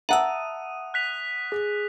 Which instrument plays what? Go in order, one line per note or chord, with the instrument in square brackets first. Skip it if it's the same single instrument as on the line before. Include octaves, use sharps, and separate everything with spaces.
[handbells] E5 A5 E6 [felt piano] F#5 A#5 [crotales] D#6 D#7
[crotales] F#6 B6 F7
[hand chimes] G#4